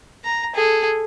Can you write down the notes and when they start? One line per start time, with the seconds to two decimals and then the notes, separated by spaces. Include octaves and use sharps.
0.24 A#5
0.55 G#4 A4